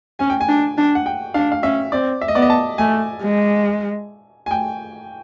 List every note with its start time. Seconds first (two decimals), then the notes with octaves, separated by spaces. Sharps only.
0.19 C#4 G#5
0.30 G5
0.41 G#5
0.48 D4
0.78 D4
0.95 F#5
1.06 G5
1.34 D4 F5
1.52 F5
1.63 C#4 E5
1.92 C4 D5
2.22 E5
2.28 D#5
2.35 B3 D5
2.42 D#5
2.50 A5
2.78 A3 G#5
3.22 G#3
4.46 G#5
4.51 G5